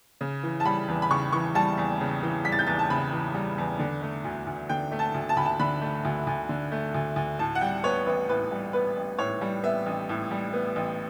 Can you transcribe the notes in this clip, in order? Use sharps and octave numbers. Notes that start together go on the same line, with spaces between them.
C#3
E3
A5
G3 B5
E2
B5
C#3 C#6
E3 C#6
G3 A5
E2
C#3
E3
G3 B6
A6
G6
E2 A6
A5
C#3 B5
E3
G3
E2
D3
A3
D2
D2
D3 G5
A3
A5
D2
A5
D2 B5
A5
D3 B5
A3
D2
D2
D3
A3
D2
D2
A2 A5
F#5
G3 G5
B3 C#5
A1 B4
A2 B4
G3
B3 B4
A1
A2 C#5
G3
B3 E5
A1
A2
G3
B3
A1